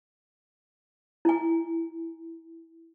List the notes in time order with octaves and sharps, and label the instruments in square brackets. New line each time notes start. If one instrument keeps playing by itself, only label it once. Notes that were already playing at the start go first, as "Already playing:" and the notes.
[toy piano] E4 G#5